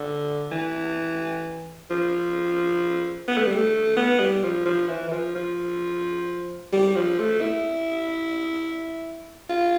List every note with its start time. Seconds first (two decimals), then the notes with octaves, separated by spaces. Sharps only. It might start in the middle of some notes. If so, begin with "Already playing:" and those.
Already playing: D3
0.51 E3
1.90 F3
3.28 B3
3.38 A3
3.46 G3
3.56 A3
3.97 B3
4.20 G3
4.43 F3
4.66 F3
4.88 E3
5.08 E3
5.12 F3
5.35 F3
6.73 G3
6.96 F3
7.19 A3
7.41 E4
9.50 F4